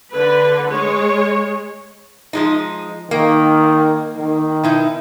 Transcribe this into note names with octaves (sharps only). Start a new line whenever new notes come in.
D3 B4
G#3 C#5
F3 G#3 D#4
D#3 A#3
D#3
B2 D#4 E4